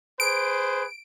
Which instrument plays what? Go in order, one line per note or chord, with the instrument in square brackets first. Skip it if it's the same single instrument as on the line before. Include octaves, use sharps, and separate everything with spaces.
[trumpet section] G#4 B4 C5 [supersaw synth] D7